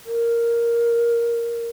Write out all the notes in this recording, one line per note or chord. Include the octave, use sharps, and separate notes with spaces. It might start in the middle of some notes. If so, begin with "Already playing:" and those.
A#4